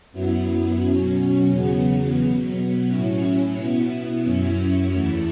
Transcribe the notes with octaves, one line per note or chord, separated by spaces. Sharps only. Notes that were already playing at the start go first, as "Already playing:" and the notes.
F#2 F#3 B3 E4
B2 F#3 C#4
E2 C#3 F#3 B3
B2 F#3 B3
A2 F#3 C#4 E4
B2 B3 E4
F#2 F#3 C#4 E4
E2 E3 A3 E4